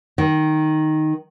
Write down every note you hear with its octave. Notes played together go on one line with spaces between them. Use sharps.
D#3